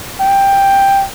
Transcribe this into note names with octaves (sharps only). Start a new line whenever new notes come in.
G5